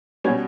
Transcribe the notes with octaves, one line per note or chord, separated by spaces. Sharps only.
B2 G3 C#4 C#5